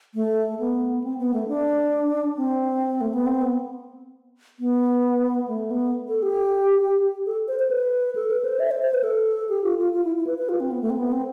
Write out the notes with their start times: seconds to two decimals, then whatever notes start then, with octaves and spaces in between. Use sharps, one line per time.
0.14 A3
0.59 B3
1.04 C4
1.18 B3
1.34 A3
1.48 D4
2.37 C4
3.01 A3
3.13 B3
3.26 C4
3.41 B3
4.59 B3
5.48 A3
5.71 B3
6.08 A4
6.22 G4
7.26 A4
7.48 C5
7.59 C5
7.71 B4
8.15 A4
8.30 B4
8.44 C5
8.60 E5
8.71 C5
8.82 C5
8.94 B4
9.04 A4
9.49 G4
9.64 F4
9.78 F4
9.93 F4
10.04 E4
10.16 E4
10.27 B4
10.38 B4
10.49 F4
10.60 C4
10.71 B3
10.82 A3
10.90 C4
10.97 B3
11.12 C4